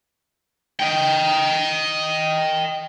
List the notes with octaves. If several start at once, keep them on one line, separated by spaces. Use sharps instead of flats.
D#5 G5